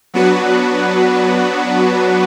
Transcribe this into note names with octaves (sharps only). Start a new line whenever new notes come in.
F#3 B3 D4 F#4 B4